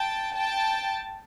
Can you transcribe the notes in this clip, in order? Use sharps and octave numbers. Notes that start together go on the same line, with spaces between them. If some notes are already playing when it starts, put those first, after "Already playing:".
Already playing: G5 A5
G5 A5